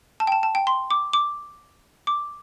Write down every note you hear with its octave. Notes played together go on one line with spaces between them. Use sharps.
A5
G5
A5
A5
G5
C6
D6
D6
D6